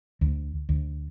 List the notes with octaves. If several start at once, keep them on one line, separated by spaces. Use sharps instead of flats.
D2
D2